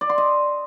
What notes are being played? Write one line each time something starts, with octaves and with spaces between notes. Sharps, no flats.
D5
C6
D#5